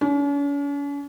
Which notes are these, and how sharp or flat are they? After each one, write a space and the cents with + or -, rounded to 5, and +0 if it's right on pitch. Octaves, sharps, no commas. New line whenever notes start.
C#4 +45